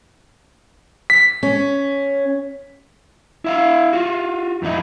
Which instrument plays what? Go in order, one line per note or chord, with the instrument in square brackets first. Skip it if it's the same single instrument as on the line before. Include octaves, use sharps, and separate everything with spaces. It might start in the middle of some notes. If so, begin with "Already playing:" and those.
[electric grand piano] B6
[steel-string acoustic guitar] C#4
[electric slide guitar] E4 E5 F5
F4 F#4
F2 D#3 D#4 E4